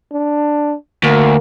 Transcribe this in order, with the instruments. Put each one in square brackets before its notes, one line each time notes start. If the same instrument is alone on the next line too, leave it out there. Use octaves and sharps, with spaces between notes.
[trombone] D4
[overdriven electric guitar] D2 [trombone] A#3